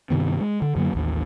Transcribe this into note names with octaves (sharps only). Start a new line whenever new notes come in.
G2 C3 D#3 B3
G#3
D3
F#2 D3 F#3 A#3
A1 D#2